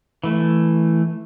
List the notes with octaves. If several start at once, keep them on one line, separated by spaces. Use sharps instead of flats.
E3 A3